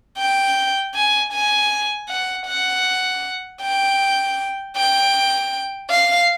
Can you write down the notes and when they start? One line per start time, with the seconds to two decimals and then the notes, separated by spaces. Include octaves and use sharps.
0.18 G5
0.95 G#5
1.33 G#5
2.08 F#5
2.46 F#5
3.62 G5
4.76 G5
5.90 F5